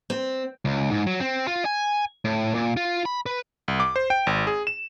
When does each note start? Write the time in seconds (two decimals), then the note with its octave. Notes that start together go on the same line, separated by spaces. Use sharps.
0.10 C4
0.65 C#2
0.91 G#2
1.07 F#3
1.20 C4
1.47 F4
1.65 G#5
2.25 A2
2.55 A#2
2.77 F4
3.05 B5
3.26 B4
3.68 C2
3.80 D6
3.96 C5
4.10 G5
4.27 G#1
4.47 G#4
4.67 E7